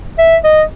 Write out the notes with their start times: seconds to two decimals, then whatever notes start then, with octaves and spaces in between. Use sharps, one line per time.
0.18 E5
0.44 D#5